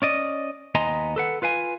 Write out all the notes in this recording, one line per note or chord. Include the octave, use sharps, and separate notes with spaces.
C#4 D5 D#5
D#2 B3 D#5 G#5 A#5 C6
A4 B4 F#5
F4 B4 F5 G#5